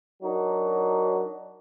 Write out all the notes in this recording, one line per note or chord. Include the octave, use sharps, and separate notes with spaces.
F#3 D4 D#4 F#4 A#4